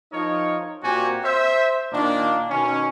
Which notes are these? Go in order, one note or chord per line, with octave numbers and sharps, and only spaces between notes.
F3 D#4 A#4 C#5 D#5
A#2 C4 F#4 G4 G#5
C5 E5
A#2 D#3 A#3 D4
B2 D#3 C#4